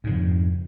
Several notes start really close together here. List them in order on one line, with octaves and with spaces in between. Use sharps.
G#2 C#3 F2